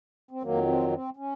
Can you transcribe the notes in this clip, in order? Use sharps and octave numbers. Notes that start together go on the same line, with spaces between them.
C4
F2 D#3 F#3 A#3
C4
C4
C#4